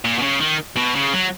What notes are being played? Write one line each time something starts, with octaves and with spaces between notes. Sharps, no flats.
A#2
B2
C#3
D#3
B2
C#3
F#3